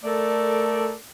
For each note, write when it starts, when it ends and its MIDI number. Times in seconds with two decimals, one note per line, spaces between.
0.04 0.93 57
0.04 0.93 69
0.04 0.93 70
0.04 0.93 74